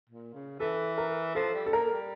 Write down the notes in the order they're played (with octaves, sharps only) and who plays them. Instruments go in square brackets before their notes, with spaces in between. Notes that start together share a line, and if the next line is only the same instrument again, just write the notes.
[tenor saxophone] A#2
C#3
[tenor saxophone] E3 [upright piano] A4
[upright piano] A#4
[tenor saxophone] F3 [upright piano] A4
[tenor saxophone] G3
[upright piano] A4
[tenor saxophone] A#3 [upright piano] A#4
[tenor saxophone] G3